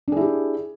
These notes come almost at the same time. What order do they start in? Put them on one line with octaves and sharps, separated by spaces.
D4 G#4 E4 G4